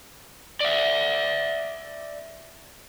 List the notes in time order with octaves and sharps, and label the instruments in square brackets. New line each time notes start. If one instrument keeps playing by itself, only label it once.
[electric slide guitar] D5 E5